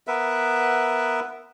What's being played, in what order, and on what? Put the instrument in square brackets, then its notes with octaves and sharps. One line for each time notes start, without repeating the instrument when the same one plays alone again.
[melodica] B3 A#4 B4 E5